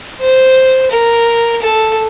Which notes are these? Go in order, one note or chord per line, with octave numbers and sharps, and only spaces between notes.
C5
A#4
A4